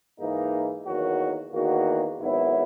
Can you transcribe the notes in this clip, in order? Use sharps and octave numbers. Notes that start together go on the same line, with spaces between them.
G#2 E3 A#3 D#4
E2 D#3 F#3 A#3 F#4
E2 D#3 A#3 F#4
G#1 G#2 F#3 B3 E4